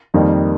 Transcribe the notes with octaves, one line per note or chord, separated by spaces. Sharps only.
F2 D#3 G3 A#3 D#4